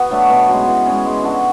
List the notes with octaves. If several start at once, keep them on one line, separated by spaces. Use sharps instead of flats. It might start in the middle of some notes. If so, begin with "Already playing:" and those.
Already playing: B3 F#4
F#3 A3 D4
B2
G#3 C#4 F#4
E3
G#3 C#4 G#4
G#3
D4 F#4 A4